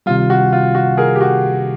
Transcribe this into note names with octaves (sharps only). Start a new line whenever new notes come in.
C3 D#3 G3 F4
F#4
F4
F#4
G#4 A#4
G4
F#4